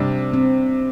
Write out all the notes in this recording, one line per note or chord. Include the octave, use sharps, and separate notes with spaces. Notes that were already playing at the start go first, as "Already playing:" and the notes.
Already playing: C3 G3 D4
C4